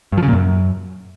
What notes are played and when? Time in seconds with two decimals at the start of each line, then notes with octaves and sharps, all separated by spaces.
0.12 G2
0.18 F3
0.23 C#3
0.28 A#2
0.33 F#2